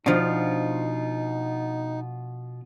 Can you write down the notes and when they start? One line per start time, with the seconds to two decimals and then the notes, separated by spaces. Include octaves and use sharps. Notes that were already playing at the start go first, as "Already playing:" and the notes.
0.06 B2 F3 D4 D#4 F4